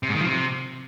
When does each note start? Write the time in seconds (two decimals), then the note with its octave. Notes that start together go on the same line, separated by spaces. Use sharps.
0.03 C3
0.09 G#2
0.15 D#3
0.21 F3
0.27 C3